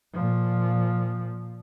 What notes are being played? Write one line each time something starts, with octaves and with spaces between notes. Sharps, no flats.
A#2 F3